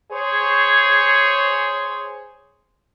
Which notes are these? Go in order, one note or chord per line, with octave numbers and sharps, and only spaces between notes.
G#4 C5 C#5